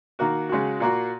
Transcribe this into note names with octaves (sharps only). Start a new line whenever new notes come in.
D#3 A#3 F#4
C#3 G#3 F#4
A#2 A#3 F#4